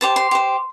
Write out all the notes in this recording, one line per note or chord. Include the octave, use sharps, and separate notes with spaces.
G4 C5 A5
C6
G4 C5